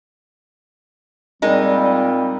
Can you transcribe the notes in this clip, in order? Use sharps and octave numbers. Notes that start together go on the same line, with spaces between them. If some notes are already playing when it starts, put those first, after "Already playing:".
A#2 G3 G#3 C4 D#4